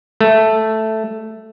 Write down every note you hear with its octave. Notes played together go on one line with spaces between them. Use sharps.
A3